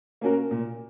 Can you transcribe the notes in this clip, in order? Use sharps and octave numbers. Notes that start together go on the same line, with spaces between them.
A#3 C#4 F#4 A#4
A#2